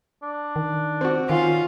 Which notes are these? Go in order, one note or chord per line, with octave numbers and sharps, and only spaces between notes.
D4
D#3
C4 F#4
D#3 C#4 F4